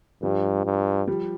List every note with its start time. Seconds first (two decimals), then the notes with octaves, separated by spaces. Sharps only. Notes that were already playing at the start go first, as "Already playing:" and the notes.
0.23 G2 F3 G3
0.65 G2
1.08 F3 G3